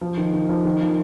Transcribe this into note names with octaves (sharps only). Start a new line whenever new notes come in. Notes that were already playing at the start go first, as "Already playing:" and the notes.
F3
D#3
D#3
F3
D#3
F3